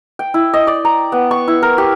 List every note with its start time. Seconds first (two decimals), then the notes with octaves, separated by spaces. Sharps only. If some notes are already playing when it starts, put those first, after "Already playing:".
0.19 G5
0.34 E4
0.54 D#5
0.67 D5
0.85 A#5
1.12 B3
1.31 C#6
1.48 E4
1.63 A#4
1.78 G4